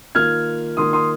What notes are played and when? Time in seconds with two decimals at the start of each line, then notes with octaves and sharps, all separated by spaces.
0.15 D#3 A#3 F4 F6 G#6
0.77 D#3 A#3 F4 C6 D#6
0.93 C6 D#6